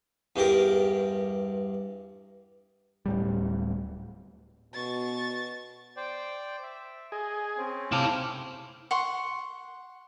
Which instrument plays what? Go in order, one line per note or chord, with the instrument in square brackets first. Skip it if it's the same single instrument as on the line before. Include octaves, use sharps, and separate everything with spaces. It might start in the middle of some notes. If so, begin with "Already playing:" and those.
[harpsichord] E2 G2 G4 A#4
[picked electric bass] D1 A2 G3
[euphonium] B2 [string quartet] C#6 A6
[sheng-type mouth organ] C5 D5 G5
E5
[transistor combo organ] G#4 [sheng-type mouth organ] D#5
[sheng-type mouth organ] C4 C#4
[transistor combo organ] C3 F5 D6 [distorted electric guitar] E4 A5
[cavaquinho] F#5 C6 C#6